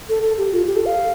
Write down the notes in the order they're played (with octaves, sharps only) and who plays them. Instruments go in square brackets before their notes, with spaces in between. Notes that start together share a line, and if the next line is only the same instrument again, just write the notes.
[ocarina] A4
A4
G4
F4
G4
A4
F5